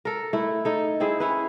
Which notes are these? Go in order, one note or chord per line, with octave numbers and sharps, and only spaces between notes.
A4 A#4
A3 E4
D#4 A4
C4 E4 G#4
C#4 E4 B4